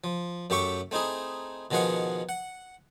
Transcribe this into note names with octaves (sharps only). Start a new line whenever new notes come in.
F3
F#2 A3 G4 E5 C#6 D6
A3 C4 D#4 E4 G#4
B2 D#3 F3 G#4 F5 F#5
F#5